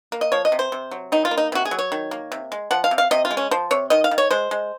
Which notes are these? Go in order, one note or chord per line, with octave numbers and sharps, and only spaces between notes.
A#3
D#5
F3 C#5
D#5
C3
C5
C3
F#3
D#3 D#4
F4
A#3
D#4
C3 F#4
G#4
F#3
C#5
D#3
A#3
C3
G#3
F3 F#5
F5
C3
F5
C3 D#5
F4
G#3
C#4
F3 C5
C3 C#5
D#3 D#5
F5
D#3
C#5
G#3 C5
G#3